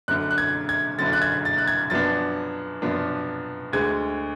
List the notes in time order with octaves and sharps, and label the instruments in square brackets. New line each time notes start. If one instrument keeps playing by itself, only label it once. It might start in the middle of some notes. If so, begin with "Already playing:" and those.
[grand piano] F#1 F#2 D3 F#6
F#6
G#6
G#6
F#1 F#2 D3 A6
F#6
G#6
A6
F#6
G#6
F#2 F3 B3 D4 A6
F#2 F3 B3 D4
D2 D3 G#3 G#6